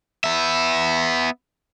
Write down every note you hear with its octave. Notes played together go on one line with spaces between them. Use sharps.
B3 E5